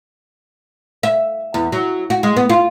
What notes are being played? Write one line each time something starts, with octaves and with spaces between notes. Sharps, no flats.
E5
E2
F#3
F#4
G#3
B3
F4